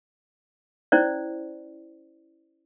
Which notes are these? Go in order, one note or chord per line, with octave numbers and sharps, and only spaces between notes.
C#4 E4 C5 D5